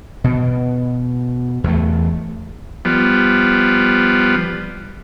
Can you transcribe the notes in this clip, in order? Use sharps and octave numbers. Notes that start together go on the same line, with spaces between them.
B2
E2 A3
F3 G3 B3